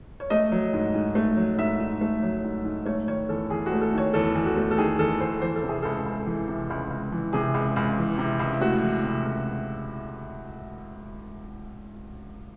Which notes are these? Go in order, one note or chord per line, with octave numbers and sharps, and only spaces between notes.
C#5
A3 D#5
F#3
G#2
G#2
A3
F#3
G#2 E5
G#2
A3
F#3
G#2
G#2
A3 C#5
D#3 C#5
E2 A4
E2 G#4
F#4
A3
A4
D#3 C#5
E2 A4
E2
F#4
A3
A4
D#3 G#4
E2 A4
E2 C5
E3 C5
A4
C3
G#4
C#2 A4
C#2
E3
C3
C#2
C#2
E3
C3 G#4
C#2
C#2
E3
C3
C#2
E4
A3 F#4
E3
C3
C#2